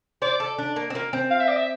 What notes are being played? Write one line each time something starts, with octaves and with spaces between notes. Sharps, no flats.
C5 D5
A4
D4
A#3
C4
A#3
C4
F5
E5
D5
E5